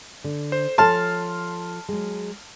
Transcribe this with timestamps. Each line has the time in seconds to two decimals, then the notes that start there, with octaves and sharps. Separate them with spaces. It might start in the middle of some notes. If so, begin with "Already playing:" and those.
0.24 D3
0.52 C5
0.78 F3 A4 C#5 A5 C6 F6
1.89 F#3 G#3